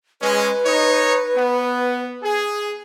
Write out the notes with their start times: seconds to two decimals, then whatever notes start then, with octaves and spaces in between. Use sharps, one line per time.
0.22 G#3 C#4 B4
0.66 D#4 C#5
1.36 B3
2.23 G#4